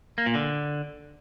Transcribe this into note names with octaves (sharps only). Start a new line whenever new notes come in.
A#3
A#2
D3